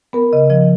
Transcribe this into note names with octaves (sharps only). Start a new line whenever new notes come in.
B3 A#4
C#3 D#5
F3 D#5